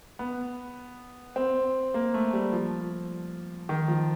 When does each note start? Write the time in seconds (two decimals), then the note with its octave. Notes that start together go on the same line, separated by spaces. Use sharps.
0.19 B3
1.36 C4
1.94 A#3
2.14 A3
2.33 G3
2.52 F3
3.69 D#3
3.88 F3